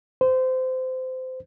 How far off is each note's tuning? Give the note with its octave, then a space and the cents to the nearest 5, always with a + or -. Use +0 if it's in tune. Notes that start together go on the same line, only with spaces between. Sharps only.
C5 -25